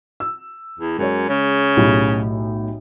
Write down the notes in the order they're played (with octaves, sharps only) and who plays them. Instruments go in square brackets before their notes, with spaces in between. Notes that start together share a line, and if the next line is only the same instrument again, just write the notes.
[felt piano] E6
[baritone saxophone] E2
[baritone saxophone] F#2 [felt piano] G#3 C#5
[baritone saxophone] C#3
[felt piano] B1 A2 G4